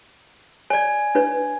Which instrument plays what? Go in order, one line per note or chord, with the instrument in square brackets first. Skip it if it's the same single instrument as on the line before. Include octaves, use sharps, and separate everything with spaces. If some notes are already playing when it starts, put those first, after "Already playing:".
[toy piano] C#5 D5 [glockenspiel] G#5 G#6
[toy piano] D4 B4 C#5